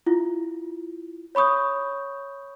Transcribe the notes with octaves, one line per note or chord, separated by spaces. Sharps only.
E4 F4
C#5 B5 C#6 D#6 G6